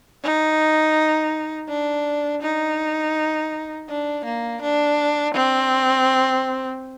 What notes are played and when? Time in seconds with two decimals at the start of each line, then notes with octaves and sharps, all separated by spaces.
0.23 D#4
1.69 D4
2.43 D#4
3.89 D4
4.25 A#3
4.62 D4
5.34 C4